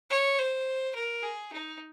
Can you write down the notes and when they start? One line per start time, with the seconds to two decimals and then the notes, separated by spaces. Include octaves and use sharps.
0.10 C#5
0.38 C5
0.95 A#4
1.23 G#4
1.52 D#4